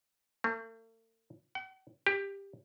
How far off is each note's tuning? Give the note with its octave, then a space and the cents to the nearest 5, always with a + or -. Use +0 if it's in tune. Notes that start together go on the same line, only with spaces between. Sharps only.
A3 +45
F#5 +45
G4 +15